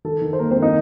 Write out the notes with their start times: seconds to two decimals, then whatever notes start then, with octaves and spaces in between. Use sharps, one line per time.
0.04 D#3 A4
0.22 D#3
0.33 C5
0.39 A#3 A#4
0.51 C4 C5
0.57 D#3
0.62 D#4 D#5